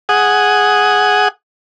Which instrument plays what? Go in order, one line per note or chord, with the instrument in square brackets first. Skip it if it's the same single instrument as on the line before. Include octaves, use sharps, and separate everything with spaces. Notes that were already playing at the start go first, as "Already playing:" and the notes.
[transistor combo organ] G#4 F#5 D#6